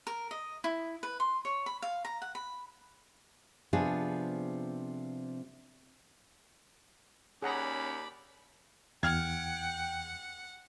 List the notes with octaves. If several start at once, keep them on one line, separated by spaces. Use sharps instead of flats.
A#4
D#5
E4
B4
C6
C#5
B5
F5
A#5
F#5
B5
C3 F3 B3 D4 F4 G#4
D#2 C#4 G#4 D5 F#5 A#5 B5
E2 F#5 G5 F6 G#6